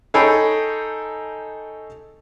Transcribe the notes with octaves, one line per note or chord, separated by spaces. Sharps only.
D#4 G#4 A4 C#5 G5 B5